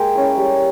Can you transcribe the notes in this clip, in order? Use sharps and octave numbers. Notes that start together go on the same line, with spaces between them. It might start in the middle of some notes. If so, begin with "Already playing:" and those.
Already playing: G#3 A#3 G5
C#4 E4
G3